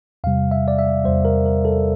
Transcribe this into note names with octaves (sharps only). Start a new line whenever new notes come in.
E2 C3 G3 F5
E5
D5
E5
E2 C3 G3 C5
A#4
A#4
A4